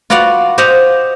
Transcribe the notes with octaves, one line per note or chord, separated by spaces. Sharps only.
F4 F#4 B4 D5 F5 F#5
G4 C5 D#5 F5 F#5